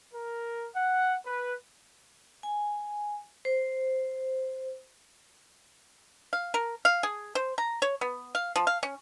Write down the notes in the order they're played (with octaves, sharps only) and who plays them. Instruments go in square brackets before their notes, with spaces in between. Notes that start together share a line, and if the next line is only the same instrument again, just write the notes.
[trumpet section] A#4
F#5
B4
[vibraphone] G#5
C5
[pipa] F5
A#4
F5
G#4
C5
A#5
C#5
B3
F5
F3
F5
C#4